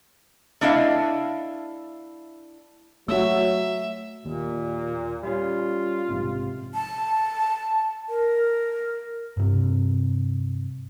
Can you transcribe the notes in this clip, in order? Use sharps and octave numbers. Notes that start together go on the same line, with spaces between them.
A3 D4 E4 D#5 F5
F#3 A3 F#4 E5 E6
D#2 A#2
G3 C#4 F4
A#1 G#2 C3
A5
A#4
G2 C3